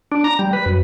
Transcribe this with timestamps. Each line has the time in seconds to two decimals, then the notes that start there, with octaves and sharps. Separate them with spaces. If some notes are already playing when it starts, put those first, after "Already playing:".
0.12 D4
0.24 A#5
0.39 G3
0.53 B4
0.66 F#2